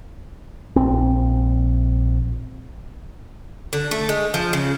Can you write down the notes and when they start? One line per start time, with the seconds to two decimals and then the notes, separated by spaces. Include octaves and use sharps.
0.76 A#1 C4
3.73 D3
3.91 A3
4.09 G#3
4.34 F3
4.53 C#3